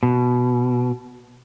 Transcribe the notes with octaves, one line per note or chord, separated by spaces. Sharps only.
B2